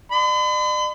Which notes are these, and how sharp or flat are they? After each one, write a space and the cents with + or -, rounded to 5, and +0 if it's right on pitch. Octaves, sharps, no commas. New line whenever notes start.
D5 +45 B5 +45